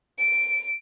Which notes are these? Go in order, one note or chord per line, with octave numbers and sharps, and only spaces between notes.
D7